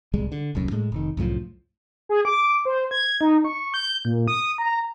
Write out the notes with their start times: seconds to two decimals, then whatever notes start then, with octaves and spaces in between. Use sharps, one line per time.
0.13 D1 C2 G3 G#3
0.32 D3
0.55 D#1 C2 F#2
0.71 A2 G#3
0.92 F1 D#3
1.17 C2 F#2 A2 F3
2.09 G#4
2.25 D6
2.65 C5
2.91 G#6
3.21 D#4
3.45 C#6
3.74 G6
4.05 A#2
4.28 D#6
4.58 A#5